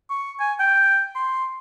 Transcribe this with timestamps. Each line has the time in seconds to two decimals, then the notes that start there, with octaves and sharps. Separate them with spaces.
0.10 C#6
0.40 G#5
0.60 G5
1.16 C6